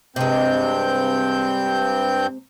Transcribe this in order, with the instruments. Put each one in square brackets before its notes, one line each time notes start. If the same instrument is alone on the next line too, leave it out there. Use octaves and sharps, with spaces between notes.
[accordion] G2 C4 G6 [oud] C3 G#3